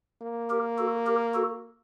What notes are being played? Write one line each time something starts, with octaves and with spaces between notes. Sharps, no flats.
A#3
G4 A#4
F#4 A4
G4 A#4
F#4 A4